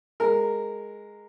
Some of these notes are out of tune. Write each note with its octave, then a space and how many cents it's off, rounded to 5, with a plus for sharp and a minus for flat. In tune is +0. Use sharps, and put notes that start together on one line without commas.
G#3 +0 A#4 -10